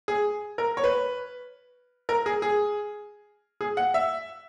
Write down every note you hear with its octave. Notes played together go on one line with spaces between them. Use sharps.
G#4
A#4
C#5
B4
A#4
G#4
G#4
G#4
F#5
E5